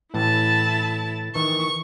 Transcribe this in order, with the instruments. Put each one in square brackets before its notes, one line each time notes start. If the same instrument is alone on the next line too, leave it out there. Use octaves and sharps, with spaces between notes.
[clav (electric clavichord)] A2 E3 [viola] E4 A5
[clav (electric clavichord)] D#3 E3 [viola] C#6